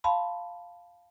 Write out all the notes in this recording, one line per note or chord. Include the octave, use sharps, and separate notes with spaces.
F5 A5 B5 C6